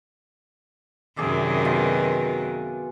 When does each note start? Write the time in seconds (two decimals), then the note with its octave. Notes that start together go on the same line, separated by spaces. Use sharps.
1.17 F#2 C3 D#3 G#4 D5 E5
1.65 B2 F4